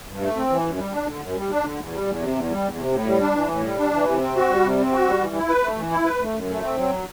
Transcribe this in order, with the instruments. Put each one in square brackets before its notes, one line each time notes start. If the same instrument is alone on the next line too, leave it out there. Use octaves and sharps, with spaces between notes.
[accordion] G2
A3
C4
E3
F#2
G3
D4
D3
F#2
G3
D4
D3
E2
G3
E2
C3
E2
G3
E2
C3
A2
G3
D4
E3
A2
G3
D4
E3
C3
C4
F#4
G3
C3
C4
F#4
G3
E3
E4
B4
A3
E3
E4
B4
A3
F#2
A3
C4
F#3